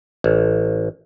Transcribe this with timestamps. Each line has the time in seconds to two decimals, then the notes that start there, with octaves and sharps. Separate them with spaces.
0.24 A1